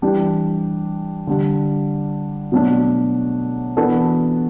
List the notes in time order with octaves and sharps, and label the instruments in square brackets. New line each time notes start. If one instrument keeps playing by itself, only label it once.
[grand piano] E3 G3 D4 G4
D3 G3 D4
B2 F#3 A3 D4
E3 B3 D4 F#4 A4